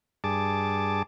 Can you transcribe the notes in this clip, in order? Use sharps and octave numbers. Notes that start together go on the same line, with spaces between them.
G2 G#4 A5 D6